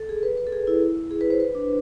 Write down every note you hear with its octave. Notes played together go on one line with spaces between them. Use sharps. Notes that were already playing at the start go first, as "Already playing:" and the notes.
Already playing: A4
G#4
B4
B4
A4
G#4
E4
G#4
B4
C5
B4
D4